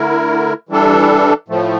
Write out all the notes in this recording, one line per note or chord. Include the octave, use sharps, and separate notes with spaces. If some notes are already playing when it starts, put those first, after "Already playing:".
Already playing: D3 A3 E4 A#4
E3 G3 D4 A4
A2 F3 A3